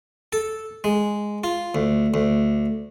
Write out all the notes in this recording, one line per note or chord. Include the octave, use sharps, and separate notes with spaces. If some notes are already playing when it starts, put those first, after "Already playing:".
A4
G#3
F4
D2
D2